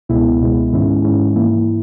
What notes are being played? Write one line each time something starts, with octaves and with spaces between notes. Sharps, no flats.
C#2 B2 G#3 B3 E4
C#2 B2 G#3 B3 E4
G#2 D#3 G#3 C#4 E4
G#2 D#3 G#3 C#4 E4
G#2 E3 A#3 E4